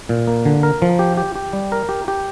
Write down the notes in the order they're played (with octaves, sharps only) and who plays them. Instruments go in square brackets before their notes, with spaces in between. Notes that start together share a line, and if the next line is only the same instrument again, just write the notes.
[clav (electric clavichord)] A#2
A#3
D3
A#4
F3
G4
G4
G4
G3
A#4
G4
G4